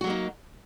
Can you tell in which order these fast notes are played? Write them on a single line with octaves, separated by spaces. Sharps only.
F#4 F#3 A#3 D#4